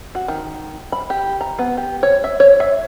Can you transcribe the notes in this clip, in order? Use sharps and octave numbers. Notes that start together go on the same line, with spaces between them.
F#4
D#3
B5
G4
A#5
B3
G4
C#5
E5
C#5
E5